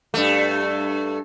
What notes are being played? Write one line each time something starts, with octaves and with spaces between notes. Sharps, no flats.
G2 A3